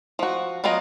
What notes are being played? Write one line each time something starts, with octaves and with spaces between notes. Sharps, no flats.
F3 F#4
F#3 B3 F4 A#4 D#5